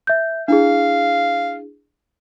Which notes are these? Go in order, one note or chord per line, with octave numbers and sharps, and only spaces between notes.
E5 G6
D4 E4 G#4 F5